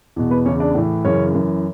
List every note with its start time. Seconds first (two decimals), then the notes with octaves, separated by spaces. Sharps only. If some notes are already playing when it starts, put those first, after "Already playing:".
0.16 E2 B2
0.31 B3 B4
0.46 E2 C#3 E3 C#4 C#5
0.60 D4 D5
0.75 A2 E3
1.04 F#2 C#3 E3 C#4 C#5
1.34 F#2 E3